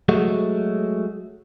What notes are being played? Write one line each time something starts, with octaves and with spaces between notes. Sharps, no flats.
F#3 G#3 A3 F#4